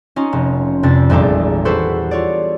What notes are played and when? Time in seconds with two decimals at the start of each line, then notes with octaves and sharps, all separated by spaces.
0.16 C#4 D#4 F4
0.33 F1
0.83 F2 C3 D4 A6
1.10 G#1 E2 A#2 G3 A4 D6
1.65 F#4 G4 A4 B4 C5
2.11 F4 C#5 D5